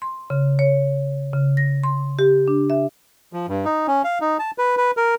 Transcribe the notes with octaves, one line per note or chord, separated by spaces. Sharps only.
C6
C#3
C#5
C#3
A#6
C6
G4
D4
E5
F3
G2
D#4
C#4
F5
D#4
A5
B4
B4
A#4